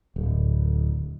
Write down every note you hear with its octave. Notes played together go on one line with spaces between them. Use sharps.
D1